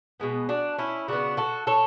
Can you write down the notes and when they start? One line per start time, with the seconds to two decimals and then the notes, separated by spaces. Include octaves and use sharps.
0.20 B2 G#3 B3
0.49 D4 F#4
0.78 C#4 E4
1.08 C#3 G#3 B3 D4 F#4
1.37 F#4 A4
1.67 A4 C#5